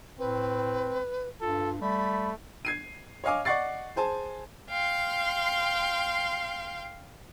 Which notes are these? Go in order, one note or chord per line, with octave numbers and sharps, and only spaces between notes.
A2 C4 B4
G2 F4 A4
G3 A3 B5
G#6 C7 D#7
C#5 D#5 F5 G#5 D6
D5 D#5 F#5 C#6 A6 C7
G#4 C5 G#5 A5
F5 G5 C6